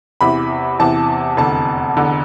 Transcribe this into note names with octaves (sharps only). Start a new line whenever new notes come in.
E2 C3 E3 B5
E2 C3 E3 A5
F1 E2 D3 A5
F1 E2 D3